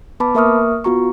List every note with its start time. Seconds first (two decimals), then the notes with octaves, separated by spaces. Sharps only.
0.20 B3 B4 A5 B5 D6
0.35 A#3 A#4 E5 C#6 D#6 F6
0.84 B3 F4 F#4 A#5 C#6